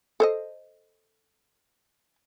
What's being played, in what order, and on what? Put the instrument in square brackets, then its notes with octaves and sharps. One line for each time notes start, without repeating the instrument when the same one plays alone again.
[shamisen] A4 C5 D#5